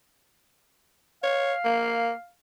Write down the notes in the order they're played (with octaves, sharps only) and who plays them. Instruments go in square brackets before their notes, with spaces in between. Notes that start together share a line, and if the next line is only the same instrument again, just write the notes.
[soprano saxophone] C#5 [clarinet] F5
[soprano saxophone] A#3